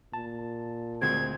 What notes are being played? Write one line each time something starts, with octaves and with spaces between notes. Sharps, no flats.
A#2 A5
D2 G#3 C4 G#6